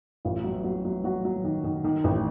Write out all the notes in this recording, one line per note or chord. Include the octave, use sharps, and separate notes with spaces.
A1 F4
F#3
F#3
F#3
F#3 F#4
F#3
D#3
D#3
D#3
A1